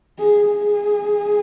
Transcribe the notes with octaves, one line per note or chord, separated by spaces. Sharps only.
G#4
G#4